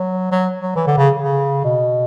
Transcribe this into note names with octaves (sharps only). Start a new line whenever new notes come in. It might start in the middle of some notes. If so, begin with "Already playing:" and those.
Already playing: F#3
F#3
F#3
E3
D3
C#3
C#3
B2